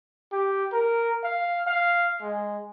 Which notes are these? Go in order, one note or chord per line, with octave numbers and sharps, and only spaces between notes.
G4
A#4
F5
F5
G#3